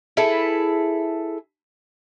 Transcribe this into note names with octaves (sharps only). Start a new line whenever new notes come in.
E4 G#4 A4 B4